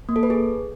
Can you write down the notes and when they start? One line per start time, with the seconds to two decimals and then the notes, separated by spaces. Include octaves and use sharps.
0.09 A#3
0.16 A4
0.23 B4
0.30 G#4